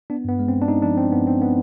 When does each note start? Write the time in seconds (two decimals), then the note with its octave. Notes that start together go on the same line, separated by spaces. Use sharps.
0.10 B3 D4
0.25 G2 B3
0.39 G#3
0.48 C4
0.54 B3
0.62 D4
0.68 G#3 D#4
0.82 F3 D4
0.97 B3 C4
1.12 G2 B3
1.27 G2 C4
1.42 B3